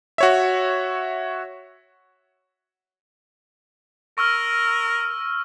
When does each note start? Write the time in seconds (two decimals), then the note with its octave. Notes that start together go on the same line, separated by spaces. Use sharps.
0.18 F#4 C#5 E5
4.18 A#4 C#6 E6 F6